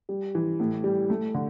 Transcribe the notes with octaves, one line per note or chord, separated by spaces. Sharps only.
G3
E3
A2
G3
A3
D3